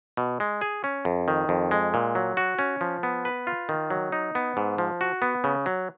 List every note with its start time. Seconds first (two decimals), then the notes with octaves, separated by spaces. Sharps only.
0.17 B2
0.40 G#3
0.61 G#4
0.84 C#4
1.05 F2
1.28 D#3
1.49 F2
1.71 G#3
1.94 A#2
2.15 F#3
2.37 F#4
2.59 C#4
2.81 F3
3.03 B3
3.25 B4
3.47 F4
3.69 D#3
3.90 F#3
4.12 D#4
4.35 B3
4.57 G#2
4.78 F3
5.01 F#4
5.22 B3
5.44 C#3
5.66 F#3